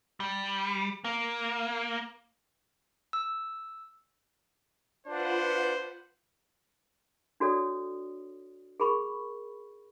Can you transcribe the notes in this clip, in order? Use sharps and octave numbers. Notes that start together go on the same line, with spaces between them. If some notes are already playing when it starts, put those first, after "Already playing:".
G3
A#3
E6
D4 F4 B4 C5 F#5
D4 F#4 A4 C#5 D5 D#6
G#4 A#4 B5 C#6